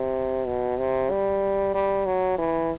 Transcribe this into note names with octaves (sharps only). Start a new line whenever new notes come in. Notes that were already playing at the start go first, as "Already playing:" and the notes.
Already playing: C3
B2
C3
G3
G3
F#3
E3